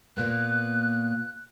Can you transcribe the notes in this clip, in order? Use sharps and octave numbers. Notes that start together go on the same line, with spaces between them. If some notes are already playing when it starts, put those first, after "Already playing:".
A#2 A#3 B3 F#6